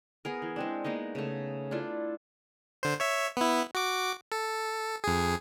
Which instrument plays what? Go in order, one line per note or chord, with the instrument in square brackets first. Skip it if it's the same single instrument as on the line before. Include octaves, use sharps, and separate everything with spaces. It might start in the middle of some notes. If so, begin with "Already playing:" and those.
[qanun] B3 G#4 A#4
E3
G#3 C4 D4
G#3 A#3 B3 D#4
C#3 A3
D4 E4 F4 A4
[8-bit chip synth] D3 C5
C#5 E5
B3 E4
F#4 D6
A4
F2 G#4